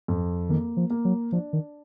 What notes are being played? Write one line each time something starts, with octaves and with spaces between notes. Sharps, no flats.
F2
D#3 A#3
F3
A#3
F#3
F3 D4
D#3